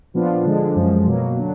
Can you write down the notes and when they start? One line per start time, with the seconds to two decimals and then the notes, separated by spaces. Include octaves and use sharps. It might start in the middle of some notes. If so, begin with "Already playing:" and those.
0.14 A#2 F3 B3 D4 F4
0.45 D3 F3 G#3 D4
0.76 F#2 F3 G#3
1.06 B2 F#3 A#3
1.37 D3 F#3 D4